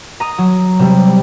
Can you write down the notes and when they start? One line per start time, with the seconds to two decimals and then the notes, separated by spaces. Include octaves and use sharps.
0.20 A#5 D#6
0.38 F#3
0.79 C3 G3